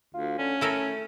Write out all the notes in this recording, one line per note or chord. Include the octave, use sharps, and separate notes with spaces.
D2 F4
D3 C#4
A3 E4 A4 A#4